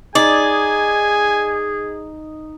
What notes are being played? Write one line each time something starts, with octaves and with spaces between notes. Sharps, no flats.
D#4 G#4 D5 G#5